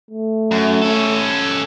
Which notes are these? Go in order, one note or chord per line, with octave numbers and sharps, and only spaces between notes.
A3
F#2
C#4 A4